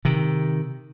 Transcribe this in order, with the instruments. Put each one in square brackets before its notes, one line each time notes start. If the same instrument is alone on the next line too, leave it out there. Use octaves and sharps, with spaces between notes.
[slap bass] C3 D#3